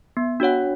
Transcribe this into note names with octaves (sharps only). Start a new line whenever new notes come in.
B3
D4 F#4 C#5 F#5